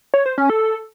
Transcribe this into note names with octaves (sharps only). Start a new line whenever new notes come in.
C#5
C5
C#4
A4